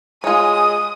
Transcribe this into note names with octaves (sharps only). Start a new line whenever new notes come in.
G#3 F4 C#5 G#5 D#6